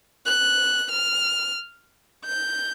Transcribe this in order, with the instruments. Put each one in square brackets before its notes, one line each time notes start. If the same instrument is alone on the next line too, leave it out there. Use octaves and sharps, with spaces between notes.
[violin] F#6
F6
G6